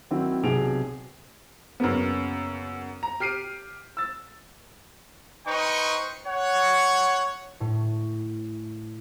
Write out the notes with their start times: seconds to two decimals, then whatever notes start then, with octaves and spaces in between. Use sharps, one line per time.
0.11 D#3 F#3 C4 E4
0.44 B1 C3 G4 G#4 D7 F7
1.80 F#2 C#3 A#3 B3
3.03 A#5
3.20 G4 F6 C7 D7 D#7
3.97 E6 A6
5.47 D#4 B4 C5 G5 C#6
6.28 C#5 F#5
7.60 A2